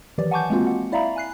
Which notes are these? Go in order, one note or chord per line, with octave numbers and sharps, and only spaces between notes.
D#3 E3 F#3 G4 D5
F#5 G#5 A5 C#6 D6 G6
G#3 A#3 C4 F4 F#4
F#5
E4 D5 E5 F5 A#5 B5
G#5 F#6 C7